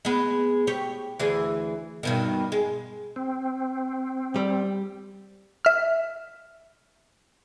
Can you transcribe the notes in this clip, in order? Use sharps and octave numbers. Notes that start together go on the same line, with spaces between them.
G#3 B3
G4 C#5
D2 E3 G#4
G2 B2 D#3
G#3
C4
G3
E5 F6